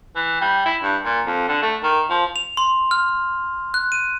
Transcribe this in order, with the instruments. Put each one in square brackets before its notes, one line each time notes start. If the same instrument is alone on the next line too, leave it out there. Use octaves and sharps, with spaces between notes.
[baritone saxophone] E3
G3
E4
G2
A#2
F2
D3
A3
D#3
F3
[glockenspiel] F7
C6
F6
F#6
D#7